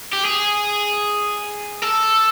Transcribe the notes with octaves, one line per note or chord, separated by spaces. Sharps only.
G4
G#4
A4